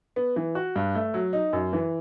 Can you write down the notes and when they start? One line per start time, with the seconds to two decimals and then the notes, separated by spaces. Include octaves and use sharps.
0.16 B3
0.36 E3
0.55 F#4
0.76 G2
0.95 A3
1.14 F#3
1.33 D#4
1.53 F#2
1.73 E3